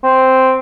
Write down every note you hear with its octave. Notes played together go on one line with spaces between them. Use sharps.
C4